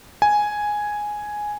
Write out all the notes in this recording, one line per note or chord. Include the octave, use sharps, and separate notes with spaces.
G#5